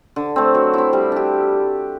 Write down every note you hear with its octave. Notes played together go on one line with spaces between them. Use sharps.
D3
A3 C4
F#3
C4 E4
G3
D4 G4